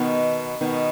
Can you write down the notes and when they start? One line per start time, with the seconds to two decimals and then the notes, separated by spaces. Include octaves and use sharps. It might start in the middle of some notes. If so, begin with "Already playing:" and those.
Already playing: B2 D#3 B3 D#4
0.61 B2 D#3 B3 D#4